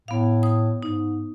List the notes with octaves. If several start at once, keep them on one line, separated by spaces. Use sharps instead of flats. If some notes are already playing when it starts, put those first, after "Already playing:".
A2 B3 F5
D#6
G#2 D#4